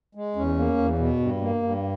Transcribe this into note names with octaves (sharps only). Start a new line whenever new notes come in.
G#3
E2 C#4
A#3
E2
B2
G2
A#3
G2